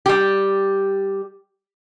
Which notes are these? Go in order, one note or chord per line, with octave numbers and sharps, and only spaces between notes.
G3 G4